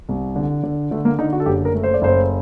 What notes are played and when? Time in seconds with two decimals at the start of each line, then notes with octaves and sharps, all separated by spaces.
0.09 C2
0.36 D3
0.63 D3
0.91 D3 A3
1.05 A#3
1.19 D3 D#4
1.33 F#4
1.40 A4
1.46 F#1 G4
1.65 A#4
1.74 A3
1.83 C5
1.94 D5
2.02 F#1 C5